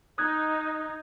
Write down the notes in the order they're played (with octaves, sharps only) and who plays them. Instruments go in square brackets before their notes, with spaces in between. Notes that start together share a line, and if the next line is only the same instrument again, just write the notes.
[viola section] D#4 [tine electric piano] D#6 F#6 G#6